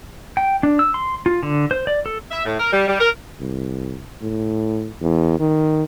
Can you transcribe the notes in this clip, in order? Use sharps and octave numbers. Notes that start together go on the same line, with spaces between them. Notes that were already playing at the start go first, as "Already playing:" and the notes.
G5
D4
E6
C6
F4
D3
C5
D5
A4
E5
A2
A#4
G3
G3
A#4
C2
A2
E2
D#3